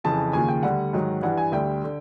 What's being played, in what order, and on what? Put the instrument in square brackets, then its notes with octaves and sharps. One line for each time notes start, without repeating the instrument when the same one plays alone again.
[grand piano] F2 C#3 E3 A5
D#2 C#3 F3 G#5
G5
D2 D3 G3 F#5
G#2 D#3 F#3
G2 E3 G3 F#5
G#5
D2 D3 G3 G5
D3